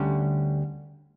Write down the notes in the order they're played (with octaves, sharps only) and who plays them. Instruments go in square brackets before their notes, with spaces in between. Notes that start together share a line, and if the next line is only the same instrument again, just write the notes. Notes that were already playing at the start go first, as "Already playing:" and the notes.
Already playing: [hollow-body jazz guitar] D2 D3 G3 C#4